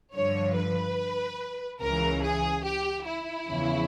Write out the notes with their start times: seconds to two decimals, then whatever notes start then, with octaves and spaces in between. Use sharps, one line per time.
0.15 G2 D3 F3 C#5
0.56 B4
1.81 C#2 C#3 E3 A#4
2.23 G#4
2.64 G4
3.06 E4
3.47 E2 C#3 F3